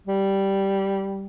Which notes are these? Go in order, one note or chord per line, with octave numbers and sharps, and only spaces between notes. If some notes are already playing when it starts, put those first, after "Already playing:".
G3